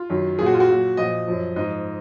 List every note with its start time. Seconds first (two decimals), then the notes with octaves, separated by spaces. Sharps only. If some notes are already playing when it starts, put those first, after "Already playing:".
Already playing: F4
0.10 F#2 D#3 F#3
0.38 A#2 F#3 G#4
0.46 F#4
0.53 F4
0.60 F#4
0.68 A#2 F#3
0.97 A#2 F3 D#5
1.28 F#2 F3
1.56 G#2 F3 D#5